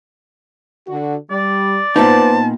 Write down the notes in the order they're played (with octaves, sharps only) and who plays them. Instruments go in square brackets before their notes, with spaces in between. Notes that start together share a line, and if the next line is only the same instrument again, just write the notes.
[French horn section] D3 F#4
[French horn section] G3 [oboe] D5
[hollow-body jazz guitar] A#2 B3 D#4 [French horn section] B4 C5 [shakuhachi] A5